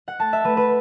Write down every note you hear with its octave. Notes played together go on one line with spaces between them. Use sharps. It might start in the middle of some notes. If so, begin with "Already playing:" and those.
F#5
A3 A5
E5
A3 B4
B4